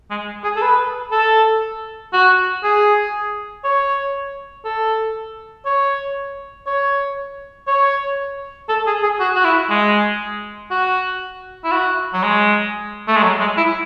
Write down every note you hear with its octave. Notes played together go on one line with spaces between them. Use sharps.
G#3
G#4
A4
B4
A4
F#4
G#4
C#5
A4
C#5
C#5
C#5
A4
G#4
G#4
F#4
F#4
E4
G#3
F#4
E4
F#4
F#3
G#3
A3
G#3
F#3
G#3
E4